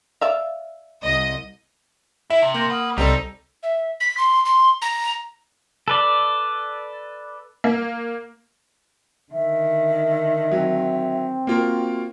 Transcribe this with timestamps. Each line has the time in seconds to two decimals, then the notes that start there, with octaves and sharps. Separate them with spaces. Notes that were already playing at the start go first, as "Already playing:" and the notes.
0.21 D5 E5 F5
1.04 C2 D#5
2.30 E4 E5
2.42 C3 A5
2.54 A#3 C6 G6 A#6
2.70 B4 F#5 D#6 F6
2.98 C2 C3 G3 C4 D#4 A4 D5 A#5
3.63 E5
4.00 B6
4.17 C6
4.45 C6
4.82 A#5
5.88 A4 B4 D5
7.64 A#3
9.32 D3 D#3 E5
10.52 F#3 C4
11.47 A#3 F4 F#4 A#4